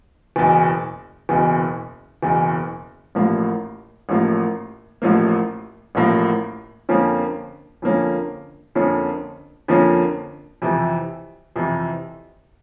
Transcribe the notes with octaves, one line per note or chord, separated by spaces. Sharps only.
F#1 E2 B2
F#1 E2 B2
F#1 E2 B2
A1 A2 F3 A#3
A1 A2 F3 A#3
A1 A2 F3 A#3
A1 A2 F3 A#3
F2 D3 F3 A#3 C#4
F2 D3 F3 A#3 C#4
F2 D3 F3 A#3 C#4
F2 D3 F3 A#3 C#4
F2 C3 E3
F2 C3 E3